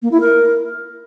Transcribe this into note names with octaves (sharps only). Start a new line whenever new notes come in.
A#3
E4
A#4